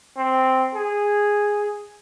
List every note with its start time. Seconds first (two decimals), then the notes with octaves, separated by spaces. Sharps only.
0.17 C4
0.75 G#4